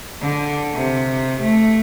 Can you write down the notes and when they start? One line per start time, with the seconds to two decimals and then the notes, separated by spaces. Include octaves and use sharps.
0.21 D3
0.73 C3
1.41 A3